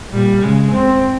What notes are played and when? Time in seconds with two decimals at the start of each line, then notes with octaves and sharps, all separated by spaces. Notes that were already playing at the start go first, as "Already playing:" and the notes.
0.13 A#2 G3
0.43 C#3 G#3
0.73 C4